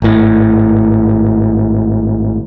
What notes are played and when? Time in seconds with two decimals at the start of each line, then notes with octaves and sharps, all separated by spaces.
0.02 G#1 A2